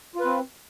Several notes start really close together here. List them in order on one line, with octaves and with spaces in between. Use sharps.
F4 B4 C4